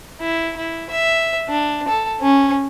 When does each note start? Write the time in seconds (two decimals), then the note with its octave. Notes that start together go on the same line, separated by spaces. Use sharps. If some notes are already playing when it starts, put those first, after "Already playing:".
0.21 E4
0.57 E4
0.90 E5
1.49 D4
1.88 A4
2.22 C#4